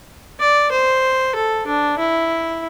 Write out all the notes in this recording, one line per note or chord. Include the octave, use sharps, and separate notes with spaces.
D5
C5
A4
D4
E4